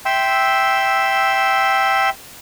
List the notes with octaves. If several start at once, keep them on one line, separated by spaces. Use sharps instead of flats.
E5 G5 C6 E6